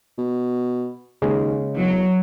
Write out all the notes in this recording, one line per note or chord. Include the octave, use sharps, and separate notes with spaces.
B2
D#2 C#3 G#3
E1 F#3